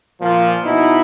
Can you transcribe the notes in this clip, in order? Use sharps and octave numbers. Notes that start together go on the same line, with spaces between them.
A#2 F3
B2 D#4 E4